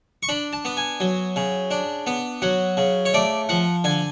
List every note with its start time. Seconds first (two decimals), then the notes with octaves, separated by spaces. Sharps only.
0.23 C#6
0.29 D4 B5
0.53 A5
0.65 B3
0.77 G#5
1.00 F#3
1.36 C#3
1.71 D4
2.07 B3
2.42 F#3 F#5
2.77 C#3
3.05 C#5
3.14 A3 D5
3.49 F3 F#5
3.84 D3 G#5